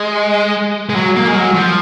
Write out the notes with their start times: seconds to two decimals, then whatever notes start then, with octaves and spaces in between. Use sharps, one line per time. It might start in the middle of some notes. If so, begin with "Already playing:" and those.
Already playing: G#3
0.89 G#3
0.96 F#3
1.16 A#3
1.28 G#3
1.35 F#3
1.55 F3